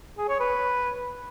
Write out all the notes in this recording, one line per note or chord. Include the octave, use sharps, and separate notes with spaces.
G#4
C#5
B4